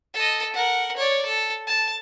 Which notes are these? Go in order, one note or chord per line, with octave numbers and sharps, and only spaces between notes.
A4 D#5
A#4 F#5
C#5 D5
A4
A5